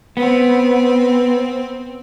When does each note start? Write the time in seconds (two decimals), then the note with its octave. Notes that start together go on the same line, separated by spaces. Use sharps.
0.17 B3 C4